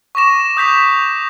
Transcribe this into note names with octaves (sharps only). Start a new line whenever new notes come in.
C#6 D6 A#6 E7
D#6 G6 B6 F7